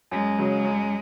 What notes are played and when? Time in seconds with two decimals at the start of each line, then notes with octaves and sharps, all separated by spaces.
0.11 F#2 G#3
0.38 C#3 F#3
0.64 F#2